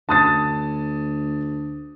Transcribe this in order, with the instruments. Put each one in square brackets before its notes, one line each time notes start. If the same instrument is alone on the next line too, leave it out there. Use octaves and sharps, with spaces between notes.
[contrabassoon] D2 [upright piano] A5 D#6 A6